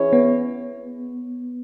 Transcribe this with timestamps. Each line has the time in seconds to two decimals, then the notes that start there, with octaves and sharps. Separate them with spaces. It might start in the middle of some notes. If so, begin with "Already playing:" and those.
Already playing: E3 C#4 E4 G#4 C#5
0.13 B3